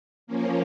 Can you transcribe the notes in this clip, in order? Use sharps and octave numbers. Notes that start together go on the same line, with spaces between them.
F3 A#3 C#4